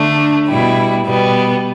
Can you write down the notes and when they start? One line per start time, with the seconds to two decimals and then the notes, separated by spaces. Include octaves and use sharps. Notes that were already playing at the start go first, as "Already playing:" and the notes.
Already playing: D3 A3 D4
0.47 B2 G3 E4
1.06 B2 G3 B3